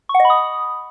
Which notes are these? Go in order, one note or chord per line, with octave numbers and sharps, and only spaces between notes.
C#6
F#5
D#5
B5
D#6